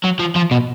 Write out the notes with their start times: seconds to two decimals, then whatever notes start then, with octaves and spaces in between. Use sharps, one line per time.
0.04 F#3
0.20 F3
0.36 F3
0.51 B2